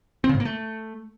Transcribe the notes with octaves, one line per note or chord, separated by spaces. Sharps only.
C4
C#3
G#2
A#3
A3